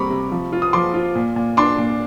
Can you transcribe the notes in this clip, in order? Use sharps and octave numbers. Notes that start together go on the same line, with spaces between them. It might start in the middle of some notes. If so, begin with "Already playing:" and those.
Already playing: C3 G3 C4 A#5 B5 C#6 D6
C3
F3
F4
D#6
F3 C6 D6
F4
A#2
A#2
D4 C6 D6
A#2